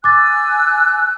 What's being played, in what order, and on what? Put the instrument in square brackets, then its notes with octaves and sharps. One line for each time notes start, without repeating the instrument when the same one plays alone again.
[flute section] G#5 E6 F#6 [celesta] D6 A6